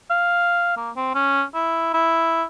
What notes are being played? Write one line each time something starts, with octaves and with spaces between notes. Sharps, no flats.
F5
A#3
C4
C#4
E4
E4